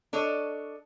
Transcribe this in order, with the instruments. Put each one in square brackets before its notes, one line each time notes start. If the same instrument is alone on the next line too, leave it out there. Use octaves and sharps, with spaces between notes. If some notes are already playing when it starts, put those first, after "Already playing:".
[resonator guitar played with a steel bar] D4 A4 C#5 D#5